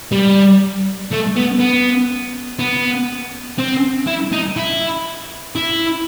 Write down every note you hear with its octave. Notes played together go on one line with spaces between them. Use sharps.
G3
A3
B3
B3
B3
C4
E4
D#4
E4
E4